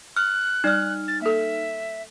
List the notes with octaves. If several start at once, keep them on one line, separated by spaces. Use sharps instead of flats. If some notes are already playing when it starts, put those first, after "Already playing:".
F6 F#6
G3 D#4 D5 F6
A6
A#3 A4 E5